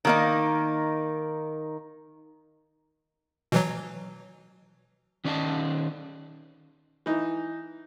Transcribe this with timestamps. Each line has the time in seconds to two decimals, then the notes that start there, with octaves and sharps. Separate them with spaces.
0.05 D#3 A#3 D#4
3.52 B2 E3 F#3
5.25 D#3 C#4 D5 D#5 G5 A5
7.06 E3 D#4